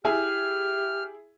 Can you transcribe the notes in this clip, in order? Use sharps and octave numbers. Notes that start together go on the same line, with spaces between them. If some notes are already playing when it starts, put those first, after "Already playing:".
E4 G4 G#4 G#5 F6